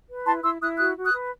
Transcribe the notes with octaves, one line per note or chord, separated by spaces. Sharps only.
B4
E4 A5 C6
E4 C6 E6
E4 D#6 F#6
F#4 D#6 F#6
F#4
D#6 F#6
B4